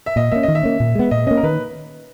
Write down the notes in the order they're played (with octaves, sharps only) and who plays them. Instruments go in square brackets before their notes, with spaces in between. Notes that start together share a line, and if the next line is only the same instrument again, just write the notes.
[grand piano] E5
[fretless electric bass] A#2 [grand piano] D#5
[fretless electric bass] A#3 C#4 [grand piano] E5
[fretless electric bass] D#3 [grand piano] D#5
[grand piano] E5
[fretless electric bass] A#3 C#4
A#2
G#3 B3
[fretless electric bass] A#2 [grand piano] D#5
[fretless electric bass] A#3 C#4 [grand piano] D#5
[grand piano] A#4
[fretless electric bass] D#3 [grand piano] B4